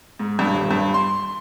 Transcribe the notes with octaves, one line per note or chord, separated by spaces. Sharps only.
G#2
G2
D#1
G2
C6